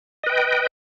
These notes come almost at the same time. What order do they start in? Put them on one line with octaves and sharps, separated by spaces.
D#5 B4 G5